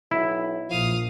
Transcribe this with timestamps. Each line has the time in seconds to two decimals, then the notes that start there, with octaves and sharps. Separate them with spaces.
0.11 B1 E4
0.70 A#1 F3 F5 D#6